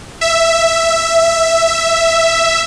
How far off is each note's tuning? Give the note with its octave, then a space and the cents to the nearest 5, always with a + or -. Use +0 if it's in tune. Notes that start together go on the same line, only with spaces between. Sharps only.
E5 +5